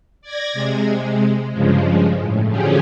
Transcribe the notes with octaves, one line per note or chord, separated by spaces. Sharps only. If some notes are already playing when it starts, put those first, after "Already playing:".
D5 G#6 A#6
C3 G#3
G2 C#3 F3 G#3
A2
D3 F3 F#3 C#4 G4 G#4